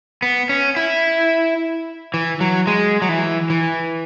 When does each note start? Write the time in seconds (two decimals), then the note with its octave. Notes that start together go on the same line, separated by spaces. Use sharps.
0.22 B3
0.49 C#4
0.76 E4
2.14 E3
2.41 F#3
2.67 G#3
3.02 F#3
3.09 E3
3.50 E3